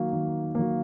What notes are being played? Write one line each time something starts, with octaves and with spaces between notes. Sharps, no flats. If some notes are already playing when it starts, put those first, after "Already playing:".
Already playing: D#3 F#3 A#3
D#3
F#3 A#3